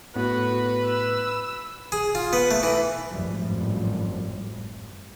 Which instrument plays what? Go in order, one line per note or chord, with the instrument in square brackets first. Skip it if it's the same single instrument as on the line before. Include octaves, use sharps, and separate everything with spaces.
[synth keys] A2 B3 [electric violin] F#4 [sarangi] B4
[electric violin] E6
[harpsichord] G#4
F4
B3
A3
E3
[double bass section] G#1 F#2 A2 F3 G3